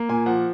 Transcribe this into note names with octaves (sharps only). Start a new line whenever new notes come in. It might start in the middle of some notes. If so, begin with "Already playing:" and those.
Already playing: A#3
A#2 G#5
F3 F#5